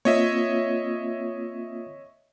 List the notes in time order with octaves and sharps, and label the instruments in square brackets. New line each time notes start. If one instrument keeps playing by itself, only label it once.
[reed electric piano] A#3 C4 F4 [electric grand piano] C#5 D#5 E5